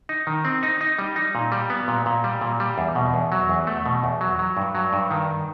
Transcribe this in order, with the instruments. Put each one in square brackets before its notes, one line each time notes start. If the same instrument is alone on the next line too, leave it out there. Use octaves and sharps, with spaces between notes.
[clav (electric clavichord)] D#4
D#3
C4
D#4
D#4
G3
D#4
A#2
G3
B3
A#2
A#2
G3
A#2
G3
E2
B2
E2
F#3
E2
A3
B2
E2
F#3
F#3
G2
F#3
G2
D#3